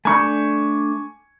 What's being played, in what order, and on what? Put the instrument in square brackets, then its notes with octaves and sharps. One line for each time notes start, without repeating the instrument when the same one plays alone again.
[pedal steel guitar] A3 D4 G6 [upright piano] G#5 C#6